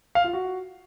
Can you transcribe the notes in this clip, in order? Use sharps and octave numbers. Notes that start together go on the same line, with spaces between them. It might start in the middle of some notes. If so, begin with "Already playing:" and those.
F5
F4
F#4